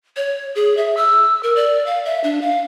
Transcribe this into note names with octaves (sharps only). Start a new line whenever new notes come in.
C#5
G#4
E5
E6
A#4
D5
F5
E5
D4
F5